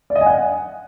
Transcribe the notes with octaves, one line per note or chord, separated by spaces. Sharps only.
D5
D#5
G#5
F#5